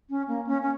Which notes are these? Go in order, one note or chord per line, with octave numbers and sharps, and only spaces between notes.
C#4
A#3
C#4
C#4